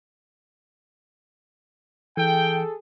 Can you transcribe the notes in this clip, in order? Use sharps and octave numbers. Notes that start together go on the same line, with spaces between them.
E3 G#4 A4 G5